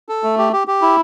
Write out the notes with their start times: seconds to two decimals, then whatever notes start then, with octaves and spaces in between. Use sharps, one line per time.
0.09 A4
0.23 A3
0.38 G4
0.53 G4
0.68 G4
0.82 E4